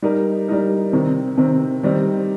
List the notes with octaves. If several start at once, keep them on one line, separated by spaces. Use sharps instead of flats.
G3 D#4 A#4
G3 D#4 A#4
C3 D#3 C4
C3 D#3 C4
D#3 G3 C4 D#4